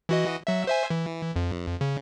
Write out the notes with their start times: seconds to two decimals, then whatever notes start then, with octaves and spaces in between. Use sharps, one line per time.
0.09 E3 F#4 D#5
0.47 F#3 E5
0.67 C5 E5 G#5
0.90 E3
1.36 F2
1.81 C#3